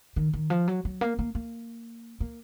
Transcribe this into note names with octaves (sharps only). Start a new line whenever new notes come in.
D#3
D#3
F3
F#3
F#3
A#3
A#3
A#3
A#3